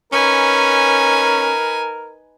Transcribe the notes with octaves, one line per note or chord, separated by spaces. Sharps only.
C#4 D#4 A#4 B4 G#5